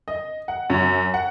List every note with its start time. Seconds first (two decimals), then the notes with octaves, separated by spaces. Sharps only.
0.08 D#5
0.48 F#5
0.70 F#2
1.14 F#5